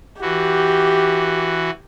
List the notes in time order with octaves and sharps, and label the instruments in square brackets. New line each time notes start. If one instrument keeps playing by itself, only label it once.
[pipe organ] E3 F#4 [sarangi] G4